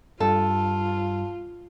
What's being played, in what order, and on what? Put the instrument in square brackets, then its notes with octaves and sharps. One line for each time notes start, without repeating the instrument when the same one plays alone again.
[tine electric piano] G2 G3 [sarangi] F4 [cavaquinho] A4